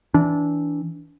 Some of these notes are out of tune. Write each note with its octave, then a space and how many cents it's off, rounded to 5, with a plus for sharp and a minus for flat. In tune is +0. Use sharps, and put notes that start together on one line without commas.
E3 -10 D4 -20